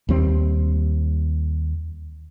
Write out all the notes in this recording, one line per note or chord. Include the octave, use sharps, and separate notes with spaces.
D#2 G3 C4